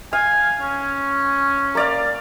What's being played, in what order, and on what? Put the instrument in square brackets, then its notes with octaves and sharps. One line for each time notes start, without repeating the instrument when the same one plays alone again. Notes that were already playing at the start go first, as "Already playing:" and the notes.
[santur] F5 [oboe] G#5
[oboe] C#4
[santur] A#3 D5 F5